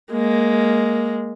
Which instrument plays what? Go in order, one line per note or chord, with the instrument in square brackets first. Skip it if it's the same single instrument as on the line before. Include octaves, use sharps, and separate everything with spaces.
[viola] G#3 A#3